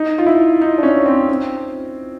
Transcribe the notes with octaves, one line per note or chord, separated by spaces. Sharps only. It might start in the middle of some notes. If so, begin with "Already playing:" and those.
Already playing: D#4
F4
E4
D#4
D4
C#4
C4
C4